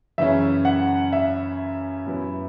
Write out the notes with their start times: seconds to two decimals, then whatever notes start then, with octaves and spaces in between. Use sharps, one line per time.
0.18 F#2 C#3 E3 C#4 E5
0.65 F#5
1.13 E5
2.06 F#2 F#3 B3 E4